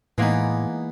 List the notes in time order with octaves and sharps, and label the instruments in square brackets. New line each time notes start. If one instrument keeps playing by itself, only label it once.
[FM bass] A2 [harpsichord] E3 D#4 [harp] G#3 A#3 B3